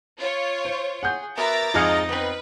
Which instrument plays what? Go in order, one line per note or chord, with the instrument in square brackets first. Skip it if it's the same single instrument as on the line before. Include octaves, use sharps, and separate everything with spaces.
[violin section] F4 C#5
[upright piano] C5
[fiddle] G#4 [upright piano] F#5 G6
[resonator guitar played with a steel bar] B3 F#4 A#4 [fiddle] E5 [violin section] A#5 D6 A6
[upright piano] F2 F6 C#7 [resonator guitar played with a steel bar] G#2 G#4 F5 [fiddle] D#4 D#5
[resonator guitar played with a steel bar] B3 C4 [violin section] B4